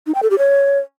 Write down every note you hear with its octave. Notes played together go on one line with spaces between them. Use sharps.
D#4
G5
A4
G4
C#5